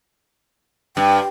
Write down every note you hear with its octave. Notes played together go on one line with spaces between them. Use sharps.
G2 G5